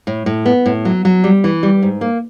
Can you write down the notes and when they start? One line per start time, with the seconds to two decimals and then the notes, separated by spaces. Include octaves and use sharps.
0.07 A2
0.26 A2
0.46 B3
0.66 A2
0.85 F#3
1.05 F#3
1.24 G3
1.44 E3
1.63 G3
1.82 G#2
2.01 A#3